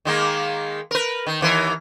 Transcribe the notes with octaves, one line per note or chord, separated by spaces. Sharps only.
D#3 G#3 A#3
A#4 B4
D#3
D#2 E3 A#4